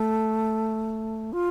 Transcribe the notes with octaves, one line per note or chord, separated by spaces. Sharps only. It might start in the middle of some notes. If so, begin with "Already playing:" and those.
Already playing: A3
F4